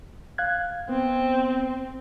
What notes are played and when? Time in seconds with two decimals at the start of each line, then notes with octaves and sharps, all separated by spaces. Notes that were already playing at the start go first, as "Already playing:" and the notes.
0.38 F5 F#6 G#6
0.89 B3 C4